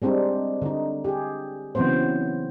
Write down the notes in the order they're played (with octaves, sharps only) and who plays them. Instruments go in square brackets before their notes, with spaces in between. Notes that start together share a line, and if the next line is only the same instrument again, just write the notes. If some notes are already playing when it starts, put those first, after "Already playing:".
[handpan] G3 G#3 C4 D4 D#4
D3 D#4
G4 G#4
C#3 E3 F#3 B3 C4 C5